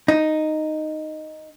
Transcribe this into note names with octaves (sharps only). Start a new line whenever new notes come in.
D#4